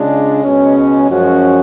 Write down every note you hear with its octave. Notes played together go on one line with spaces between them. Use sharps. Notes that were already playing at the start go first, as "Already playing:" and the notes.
Already playing: C#3 G#3 D4 F4
C#2 B2 G#3 C#4
F#2 F3 G#3 C#4 F#4